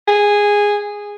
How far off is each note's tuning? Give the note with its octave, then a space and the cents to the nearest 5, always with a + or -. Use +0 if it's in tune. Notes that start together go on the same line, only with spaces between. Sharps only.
G#4 -10